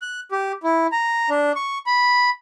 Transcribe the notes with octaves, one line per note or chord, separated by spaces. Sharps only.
F#6
G4
E4
A#5
D4
C#6
B5